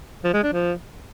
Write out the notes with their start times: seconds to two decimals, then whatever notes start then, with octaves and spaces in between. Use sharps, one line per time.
0.24 F3
0.34 G#3
0.43 D4
0.53 F3